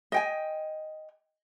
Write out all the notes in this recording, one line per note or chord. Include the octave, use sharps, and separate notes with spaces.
D#5 G5 G#5